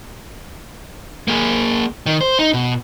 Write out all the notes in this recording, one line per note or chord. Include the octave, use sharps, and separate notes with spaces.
A#3 G#4
D#3
C5
D#4
B2